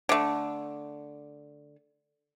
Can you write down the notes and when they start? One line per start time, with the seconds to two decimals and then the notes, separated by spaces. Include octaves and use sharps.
0.09 D3 A3